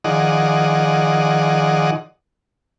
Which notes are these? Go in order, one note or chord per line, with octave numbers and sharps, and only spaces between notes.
D#3 F3 G#4 D5 D#5 F#5